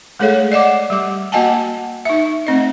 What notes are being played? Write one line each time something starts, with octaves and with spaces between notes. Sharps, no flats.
G#3 A3 G#4 A4 C#5 F5
D5 D#5 F#5 D6
G3 G4 D6
A#3 F#4 D#5 F#5 G#5 A5
D#4 E5
A3 C4 D#5